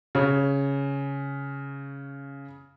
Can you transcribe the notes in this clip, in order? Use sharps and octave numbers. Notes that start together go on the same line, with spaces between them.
C#3 C#5